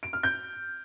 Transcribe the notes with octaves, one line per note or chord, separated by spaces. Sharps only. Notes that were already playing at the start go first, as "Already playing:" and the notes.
D7
F6
G6